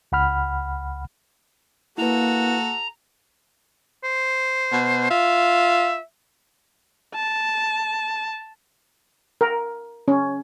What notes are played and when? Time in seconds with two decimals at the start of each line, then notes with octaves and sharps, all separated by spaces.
0.12 C#2 F#5 B5 F6
1.98 A#3 E4 F#4 A4 B4 A#5
4.04 C5
4.72 B2
5.11 F4 E5
7.15 A5
9.41 A#4
10.08 C#4